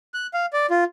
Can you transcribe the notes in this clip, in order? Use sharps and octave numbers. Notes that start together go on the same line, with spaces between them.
F#6
F5
D5
F4